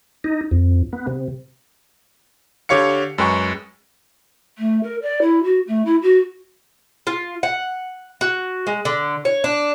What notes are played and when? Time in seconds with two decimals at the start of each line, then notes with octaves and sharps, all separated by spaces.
0.24 D#4
0.51 F2
0.93 B3
1.07 C3
2.69 D3 G4 C#5 F5 C#7
3.18 F#2 G#3 B4 G5 C#6
4.58 A3
4.83 A#4
5.02 D5
5.22 E4
5.43 F#4
5.67 A3
5.85 E4
6.02 F#4
7.07 F4
7.43 F#5
8.21 F#4
8.67 G#3
8.85 D3
9.25 C#5
9.44 D4